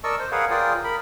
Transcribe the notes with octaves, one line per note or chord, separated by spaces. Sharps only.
A#4 D5 D#5 A5 C#6 E6
C5
G#4 A#4 B4 C#5 F5 F#5
F4 G#4 A#4 D5 G5 D#6
A#4 B5